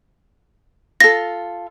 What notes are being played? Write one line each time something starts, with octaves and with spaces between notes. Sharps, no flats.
F4 A4 A#6